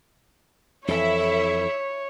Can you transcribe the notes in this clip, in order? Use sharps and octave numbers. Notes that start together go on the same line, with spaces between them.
F2 E3 E4 A4 C#5 E5